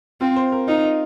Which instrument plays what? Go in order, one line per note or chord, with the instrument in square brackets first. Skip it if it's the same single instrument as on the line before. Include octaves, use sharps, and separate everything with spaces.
[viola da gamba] C4 [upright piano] F4
[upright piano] C5
A#4
[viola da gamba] D#4 [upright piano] F4
[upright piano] D#4